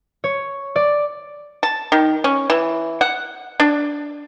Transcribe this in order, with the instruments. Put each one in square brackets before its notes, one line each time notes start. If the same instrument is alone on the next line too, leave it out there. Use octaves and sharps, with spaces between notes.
[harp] C#5
D5
[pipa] A5
D#3
C#4
E3
F#5
D4